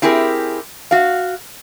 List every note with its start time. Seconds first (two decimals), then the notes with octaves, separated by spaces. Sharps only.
0.02 C4 E4 G4 G#4 A#4
0.91 F#4 F5